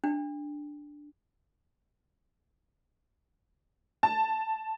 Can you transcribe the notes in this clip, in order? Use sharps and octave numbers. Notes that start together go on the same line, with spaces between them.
D4
A5